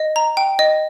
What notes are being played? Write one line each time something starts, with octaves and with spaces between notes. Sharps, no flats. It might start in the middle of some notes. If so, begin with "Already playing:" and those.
Already playing: D#5
A#5
G5
D#5